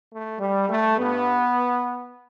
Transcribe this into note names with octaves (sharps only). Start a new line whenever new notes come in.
A3
G3
A3
G2 G3 B3